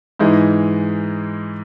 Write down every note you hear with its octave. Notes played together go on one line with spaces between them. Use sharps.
G#2 E3 G#3 D#4